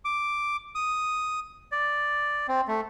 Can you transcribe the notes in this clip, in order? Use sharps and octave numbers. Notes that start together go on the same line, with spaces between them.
D6
D#6
D5
C4
A3